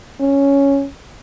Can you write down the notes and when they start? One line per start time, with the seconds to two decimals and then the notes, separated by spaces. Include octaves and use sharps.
0.20 C#4